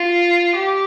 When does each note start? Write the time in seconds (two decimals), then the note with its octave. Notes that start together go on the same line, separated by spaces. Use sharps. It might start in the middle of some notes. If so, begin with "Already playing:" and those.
Already playing: F4
0.54 G4